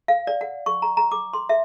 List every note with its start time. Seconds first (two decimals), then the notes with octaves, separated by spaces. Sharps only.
0.08 F5
0.27 D5
0.41 F#5
0.66 C#6
0.82 A#5
0.97 A#5
1.12 D6
1.33 C6
1.49 E5